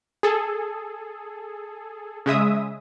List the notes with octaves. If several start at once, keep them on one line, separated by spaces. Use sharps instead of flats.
G#4 A4
C#3 G#3 E5 D#6